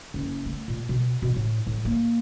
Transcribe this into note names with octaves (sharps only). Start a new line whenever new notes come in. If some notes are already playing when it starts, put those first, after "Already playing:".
F#1
A3
A#2
B2
B2
A2
A2
A#3